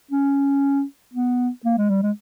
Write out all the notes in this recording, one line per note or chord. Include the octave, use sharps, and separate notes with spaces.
C#4
B3
A#3
G#3
G3
G#3